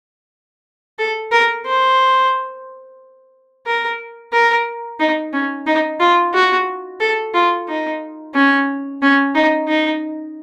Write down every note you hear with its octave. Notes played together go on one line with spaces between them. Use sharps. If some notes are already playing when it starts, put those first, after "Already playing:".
A4
A#4
C5
A#4
A#4
D#4
C#4
D#4
F4
F#4
A4
F4
D#4
C#4
C#4
D#4
D#4